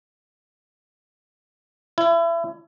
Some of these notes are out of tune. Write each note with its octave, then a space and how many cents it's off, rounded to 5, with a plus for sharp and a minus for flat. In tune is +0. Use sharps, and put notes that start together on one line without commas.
E4 +30